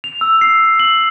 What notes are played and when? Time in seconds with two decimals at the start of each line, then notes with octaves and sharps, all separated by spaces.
0.04 F7
0.21 E6
0.41 C7
0.80 F#7